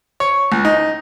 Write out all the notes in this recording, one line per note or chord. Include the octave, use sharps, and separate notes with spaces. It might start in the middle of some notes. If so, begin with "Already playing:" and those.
C#5
C#2
D#4